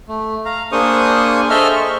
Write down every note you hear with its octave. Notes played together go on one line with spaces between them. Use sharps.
A3
F5 A#5
A#3 D4 G#4 C5 C#6 D#6
G#4 A4 C5 D#5 E5 F6
C#6